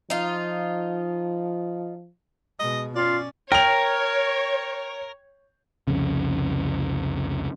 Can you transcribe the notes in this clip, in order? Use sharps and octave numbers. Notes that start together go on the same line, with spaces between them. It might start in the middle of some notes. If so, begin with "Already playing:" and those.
F3 D#4 F4
B2 G#3 D#5
C#4 F4 D5 F5
A#4 C#5 G5 F7
C2 F2 C#3